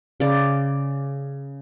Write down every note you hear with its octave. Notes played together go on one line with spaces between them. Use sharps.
C#3 D5